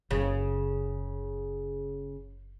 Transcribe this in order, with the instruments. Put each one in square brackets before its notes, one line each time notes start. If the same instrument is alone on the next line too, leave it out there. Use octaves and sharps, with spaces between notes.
[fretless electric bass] F#1 [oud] C#3